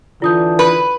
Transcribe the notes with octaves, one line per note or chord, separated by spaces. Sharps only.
D3 E3 D4 F4 D#6 G6
B4